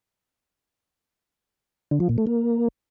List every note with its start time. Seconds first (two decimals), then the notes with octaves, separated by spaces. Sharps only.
1.91 D3
2.00 F3
2.09 A#2
2.18 A3
2.27 A#3